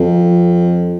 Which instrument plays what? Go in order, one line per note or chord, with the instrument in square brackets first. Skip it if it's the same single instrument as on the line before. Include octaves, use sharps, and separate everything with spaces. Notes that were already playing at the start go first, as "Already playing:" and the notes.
Already playing: [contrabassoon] F2